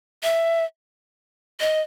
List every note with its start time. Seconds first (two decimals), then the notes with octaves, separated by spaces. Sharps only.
0.23 E5
1.61 D#5